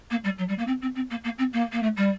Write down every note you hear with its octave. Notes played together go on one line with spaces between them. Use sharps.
A#3
G3
F#3
G3
A#3
C4
C4
C4
A#3
A#3
C4
A#3
A#3
A3
G3